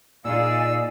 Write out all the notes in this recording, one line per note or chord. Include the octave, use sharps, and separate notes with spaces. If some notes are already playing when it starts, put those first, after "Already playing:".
A#2 D#4 F4 G#4 D5 F5 G#5 E6